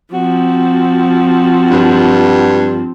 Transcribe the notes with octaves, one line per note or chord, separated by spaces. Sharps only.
F3 C4 F#4
G2